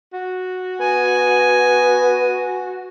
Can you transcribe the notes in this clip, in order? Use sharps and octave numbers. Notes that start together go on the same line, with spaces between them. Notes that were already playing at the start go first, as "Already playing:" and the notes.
F#4
B3 G#5